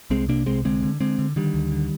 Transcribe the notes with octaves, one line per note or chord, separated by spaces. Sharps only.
C2 G#3 C4
C3 A#3 D4
C2 G#3 C4
D3 G#3 C4
D3
D3 G#3 C4
D3
D3 D#3 G3
D2
D3